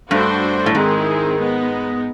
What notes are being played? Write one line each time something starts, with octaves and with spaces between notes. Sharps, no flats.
G2 A3 D4 F#4 A4 C5
A2
G#2 D#3 G#3 C4 E4 G#4
G#3 B3 D#4